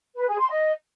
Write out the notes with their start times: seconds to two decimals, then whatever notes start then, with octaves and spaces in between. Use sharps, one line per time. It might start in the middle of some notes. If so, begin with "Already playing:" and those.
0.17 B4
0.28 G#4
0.39 C6
0.51 D#5